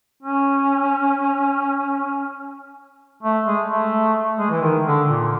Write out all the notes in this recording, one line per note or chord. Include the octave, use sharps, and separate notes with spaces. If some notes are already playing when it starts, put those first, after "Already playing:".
C#4
A3
G#3
A3
G#3
E3
D#3
D3
A#2